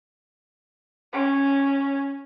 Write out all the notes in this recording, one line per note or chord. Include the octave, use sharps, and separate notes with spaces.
C#4